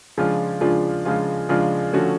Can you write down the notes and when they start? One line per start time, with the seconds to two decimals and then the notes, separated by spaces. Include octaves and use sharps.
0.18 C#3 F3 G#3 D4 F4
0.61 C#3 F3 G#3 D4 F4
1.05 C#3 F3 G#3 D4 F4
1.49 C#3 F3 G#3 D4 F4
1.93 D3 F3 A3 C#4 F#4